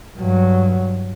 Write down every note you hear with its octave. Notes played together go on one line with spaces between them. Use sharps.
G2 F#3